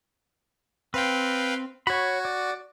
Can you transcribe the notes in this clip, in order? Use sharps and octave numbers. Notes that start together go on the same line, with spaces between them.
C4 B4 F5 G5
F#4 C#5 B5
D5